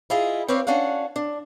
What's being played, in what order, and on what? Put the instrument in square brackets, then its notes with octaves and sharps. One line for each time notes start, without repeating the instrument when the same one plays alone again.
[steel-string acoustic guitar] E4 F4 G#4 D#5
C4 B4 C#5 D5 F5
C#4 D4 F#4 F5 F#5
D4